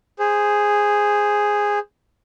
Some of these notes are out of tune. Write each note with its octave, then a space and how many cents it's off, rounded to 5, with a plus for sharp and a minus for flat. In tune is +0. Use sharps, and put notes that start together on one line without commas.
G#4 -5 C5 +0